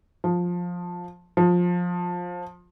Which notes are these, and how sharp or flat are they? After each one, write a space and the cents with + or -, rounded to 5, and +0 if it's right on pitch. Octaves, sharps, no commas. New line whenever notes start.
F3 +15
F3 +20